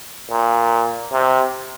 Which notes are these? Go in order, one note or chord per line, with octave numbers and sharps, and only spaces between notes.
A#2
C3